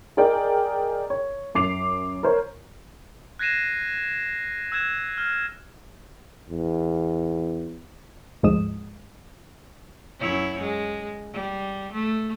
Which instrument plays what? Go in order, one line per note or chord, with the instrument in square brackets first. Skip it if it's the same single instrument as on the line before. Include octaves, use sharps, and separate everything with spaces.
[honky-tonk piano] G#4 A#4 D5 D#5 G5
C#5
F#2 D6 C7 F7
A#4 C5 C#5
[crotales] F#6 G#6 A#6 C7 D#7 E7
E6 F#6 G#6 E7
F6
[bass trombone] E2
[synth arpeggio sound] D2 G#2 F3 G#3 D#6 E7
[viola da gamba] F#2 E4 C#5
G#3
G3
A3